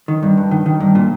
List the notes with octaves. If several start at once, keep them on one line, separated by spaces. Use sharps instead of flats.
D#3
G2
G2
D#3
D#3
G2
A#2